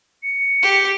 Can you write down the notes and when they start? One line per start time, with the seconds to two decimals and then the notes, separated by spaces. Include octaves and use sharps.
0.23 C#7
0.63 G4